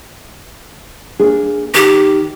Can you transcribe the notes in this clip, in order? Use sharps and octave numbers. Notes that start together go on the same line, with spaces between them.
A#3 D4 G#4
D#3 G4